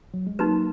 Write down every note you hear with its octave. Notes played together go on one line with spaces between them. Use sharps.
F#3
G#3
F#3 A#3 D#4 F#4 B4